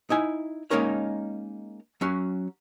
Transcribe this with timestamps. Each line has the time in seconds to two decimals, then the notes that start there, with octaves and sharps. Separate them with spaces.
0.10 D#4 E4 G#5
0.70 G#3 A#3 C#4 D#4 A#4 C#5
2.01 F#3 C#4 F#4